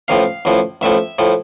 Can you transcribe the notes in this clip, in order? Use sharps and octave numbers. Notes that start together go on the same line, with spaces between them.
A1 A2 F3 F5
A1 A2 F3
A1 A2 F3 E5
A2 F3